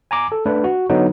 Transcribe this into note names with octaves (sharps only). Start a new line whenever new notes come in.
G#5 A#5 D6
A4
A3 D4 B4
F#4
D3 F#3 B3 D#4